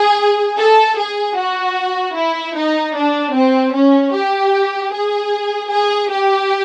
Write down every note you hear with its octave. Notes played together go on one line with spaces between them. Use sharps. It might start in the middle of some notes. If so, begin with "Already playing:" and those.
Already playing: G#4
A4
G#4
F#4
E4
D#4
D4
C4
C#4
G4
G#4
G#4
G4